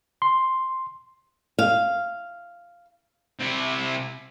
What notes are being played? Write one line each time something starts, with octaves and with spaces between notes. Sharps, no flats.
C6
F5
C3 E4